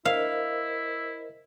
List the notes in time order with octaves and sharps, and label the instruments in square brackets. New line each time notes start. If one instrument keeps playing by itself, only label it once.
[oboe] E4 [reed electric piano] A#4 C5 D#5 [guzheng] F5